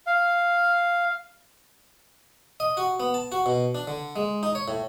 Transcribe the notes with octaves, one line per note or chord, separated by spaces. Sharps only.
F5
D#5
F#4
B3
A5
F#4
B2
D4
D3
G#3
D#4
C#5
A2